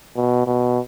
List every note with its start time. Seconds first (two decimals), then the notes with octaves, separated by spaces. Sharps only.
0.16 B2
0.47 B2